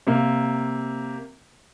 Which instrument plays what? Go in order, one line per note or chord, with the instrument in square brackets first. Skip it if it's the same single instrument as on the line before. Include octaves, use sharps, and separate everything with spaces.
[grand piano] C3 A#3